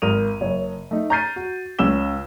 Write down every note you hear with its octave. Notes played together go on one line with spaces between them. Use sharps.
G#1 A#4 D#6 D#7 F7
F#1 C#5
A3 D#4
A#5 F6 G6 A6 C7 D#7
F#4
C#2 C#4 E6 E7 G7